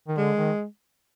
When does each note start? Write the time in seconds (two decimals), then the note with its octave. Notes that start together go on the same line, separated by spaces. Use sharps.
0.08 D#3
0.17 D3 G#3
0.37 D#3